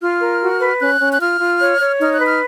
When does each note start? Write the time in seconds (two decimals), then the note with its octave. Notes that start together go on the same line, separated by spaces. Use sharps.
0.01 F4 F6
0.21 A#4
0.41 F#4
0.60 B4
0.80 C#4 F#6
1.00 C#4
1.13 F#6
1.20 F4 F6
1.40 F4
1.60 C#5
1.80 C#5
2.00 D#4 F6
2.13 F#6
2.20 B4
2.27 F6